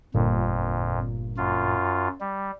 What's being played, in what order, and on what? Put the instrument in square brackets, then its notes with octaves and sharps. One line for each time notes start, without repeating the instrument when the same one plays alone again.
[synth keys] G1 A#2 [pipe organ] F2
[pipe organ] F#2 F4
G3